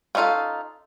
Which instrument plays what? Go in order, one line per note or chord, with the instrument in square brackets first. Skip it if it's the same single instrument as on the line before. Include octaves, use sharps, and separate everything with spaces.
[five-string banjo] B3 C#4 D#4 F4 A4